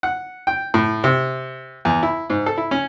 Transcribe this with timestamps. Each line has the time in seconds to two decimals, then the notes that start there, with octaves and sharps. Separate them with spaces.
0.03 F#5
0.47 G5
0.74 A2
1.04 C3
1.85 E2
2.03 E4
2.30 G#2
2.46 A4
2.58 E4
2.71 C#4